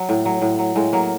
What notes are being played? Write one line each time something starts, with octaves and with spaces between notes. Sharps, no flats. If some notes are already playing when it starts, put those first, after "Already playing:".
Already playing: F#3
A2
F#3
A2
F#3
A2 G#3
F#3 A#3